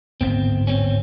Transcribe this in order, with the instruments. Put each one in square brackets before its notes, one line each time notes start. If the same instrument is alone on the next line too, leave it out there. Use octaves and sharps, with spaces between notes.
[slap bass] D1 G#1 B3 [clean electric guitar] C4
[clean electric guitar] C4 C#4